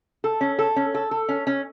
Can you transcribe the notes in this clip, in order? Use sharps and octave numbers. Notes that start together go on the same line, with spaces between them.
A4
C#4
A4
C#4
A4
A4
C#4
C#4